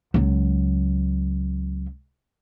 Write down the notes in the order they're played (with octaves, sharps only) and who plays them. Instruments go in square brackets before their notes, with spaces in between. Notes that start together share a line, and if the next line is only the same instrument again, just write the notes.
[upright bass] C#2 F#3